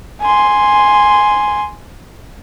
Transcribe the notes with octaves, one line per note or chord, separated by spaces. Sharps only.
G#5 C6